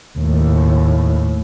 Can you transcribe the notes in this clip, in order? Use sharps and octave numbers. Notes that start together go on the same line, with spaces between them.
D#2 A2